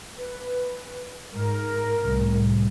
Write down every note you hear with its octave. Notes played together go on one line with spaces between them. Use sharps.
B4
G#2 A#4
C2 A2